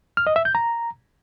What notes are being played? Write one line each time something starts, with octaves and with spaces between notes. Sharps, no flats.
F6
D#5
E5
G6
A#5